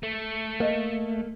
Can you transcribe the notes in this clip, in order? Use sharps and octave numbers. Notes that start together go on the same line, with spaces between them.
A3
A#3 D#5